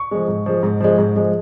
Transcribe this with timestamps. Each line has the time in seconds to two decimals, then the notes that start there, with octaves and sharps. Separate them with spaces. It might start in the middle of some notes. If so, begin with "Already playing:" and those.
Already playing: C#6
0.11 F3 G#3
0.28 G#2
0.46 F3 G#3
0.63 G#2
0.80 F3 G#3
0.98 G#2
1.16 F3 G#3